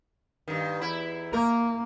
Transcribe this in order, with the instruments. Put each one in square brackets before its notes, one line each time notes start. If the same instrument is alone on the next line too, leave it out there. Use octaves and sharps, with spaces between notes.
[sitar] G2 D#3
E2 E4
[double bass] A#3 [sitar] A#4